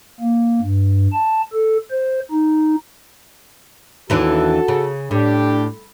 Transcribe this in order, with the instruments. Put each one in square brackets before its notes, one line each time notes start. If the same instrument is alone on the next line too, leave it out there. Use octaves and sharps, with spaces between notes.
[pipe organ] A#3
G2
A5
A4
C5
D#4
[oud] D#2 E3 D4 [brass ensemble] F#4 A4
[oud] C#3
[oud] A2 [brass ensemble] D4 G4